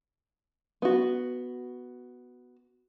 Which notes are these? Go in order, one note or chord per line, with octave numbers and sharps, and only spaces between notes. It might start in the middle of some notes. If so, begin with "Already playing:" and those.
B3 F#4